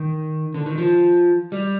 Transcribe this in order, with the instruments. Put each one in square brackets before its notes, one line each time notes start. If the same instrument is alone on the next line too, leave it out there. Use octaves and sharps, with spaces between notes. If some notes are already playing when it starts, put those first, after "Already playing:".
Already playing: [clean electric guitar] D#3
D3
D#3
F3
G3